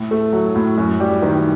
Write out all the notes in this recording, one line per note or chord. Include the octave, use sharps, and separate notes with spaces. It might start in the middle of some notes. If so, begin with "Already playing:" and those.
Already playing: A2
A3
F#3
A2
F#2
G3
D#3